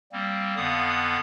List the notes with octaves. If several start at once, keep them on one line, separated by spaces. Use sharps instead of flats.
G3 A#3 C4
F2 D3 B3 F5 D#6